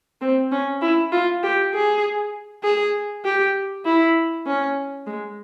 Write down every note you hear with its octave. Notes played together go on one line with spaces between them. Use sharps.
C4
C#4
E4
F4
G4
G#4
G#4
G4
E4
C#4
G#3